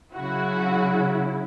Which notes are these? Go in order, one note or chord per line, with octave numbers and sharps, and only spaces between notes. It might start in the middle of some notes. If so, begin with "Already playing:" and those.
C#3 F#3 E4 F#4